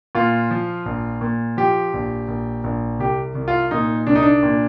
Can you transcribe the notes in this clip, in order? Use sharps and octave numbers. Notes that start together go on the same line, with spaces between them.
A#2 F4
F3
A#1
A#2
F3 G4
A#1
A#1
A#1
C2 G4
C2
F4
A#2 D#4
C2 D4
D#4
D4
A#2